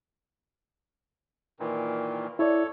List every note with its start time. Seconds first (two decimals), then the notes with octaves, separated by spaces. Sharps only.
1.60 A#2 D#3 E3
2.39 E4 A4 C#5 D5